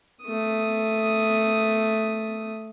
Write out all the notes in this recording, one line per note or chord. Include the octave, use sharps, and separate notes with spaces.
A3 D#6